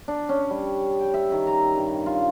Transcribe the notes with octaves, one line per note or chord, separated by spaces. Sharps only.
D4
C#4
G3
G5
E5
D#3
A#5
G2
F4